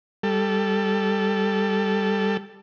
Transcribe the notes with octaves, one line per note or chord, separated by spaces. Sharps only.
G3 A4